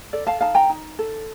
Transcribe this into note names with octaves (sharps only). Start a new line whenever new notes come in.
A4 D5
F5 A5
D#4 F5 A5
G5 A#5
D#4
A4